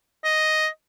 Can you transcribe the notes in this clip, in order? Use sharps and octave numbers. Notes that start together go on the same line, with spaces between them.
D#5